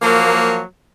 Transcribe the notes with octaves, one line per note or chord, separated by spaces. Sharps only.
F3 F#3 A#3